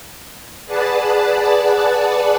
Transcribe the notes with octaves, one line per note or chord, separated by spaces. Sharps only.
G#4 B4 D5 F#5 A5